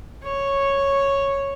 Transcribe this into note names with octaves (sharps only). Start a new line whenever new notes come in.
C#5